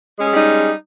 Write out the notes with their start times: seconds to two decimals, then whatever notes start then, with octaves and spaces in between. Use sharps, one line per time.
0.17 G#3
0.21 C#4
0.25 G#4
0.30 G3
0.34 D#4